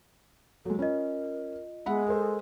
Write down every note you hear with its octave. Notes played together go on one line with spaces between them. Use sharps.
F#3 G#3 A4
C#4 F4 A#4 D#5
G#3 B3 E5 F#5 B5
A4 A#4 C5